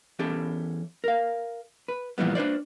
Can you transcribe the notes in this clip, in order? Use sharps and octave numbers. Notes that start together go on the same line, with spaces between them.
E2 C#4 G4 A4
A#4 F5
B4
A#2 E3 F3 G3 B3
D4 B4 C5 D5